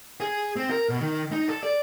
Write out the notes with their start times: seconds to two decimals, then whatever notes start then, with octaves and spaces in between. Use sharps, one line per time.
0.20 G#4
0.56 C4
0.70 A#4
0.89 B2
1.01 D#3
1.31 D#4
1.48 A4
1.63 D5